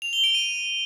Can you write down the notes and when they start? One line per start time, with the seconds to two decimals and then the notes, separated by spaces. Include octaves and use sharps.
0.02 F7
0.13 G7
0.24 D7
0.35 D#7